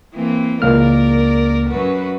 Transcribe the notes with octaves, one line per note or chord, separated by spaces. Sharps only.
E3 A#3 C4
C#2 A#3 A#4 D5 F6
F#2 F#4 B4